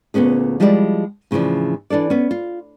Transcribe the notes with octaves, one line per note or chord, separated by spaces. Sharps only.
D2 A#2 B3 C#4 G#4
F3 G3 G#3 E4 A#4 D5
A2 C#3 E3 F3 D4
E3 D4 A4 D5
B3 C#4
F4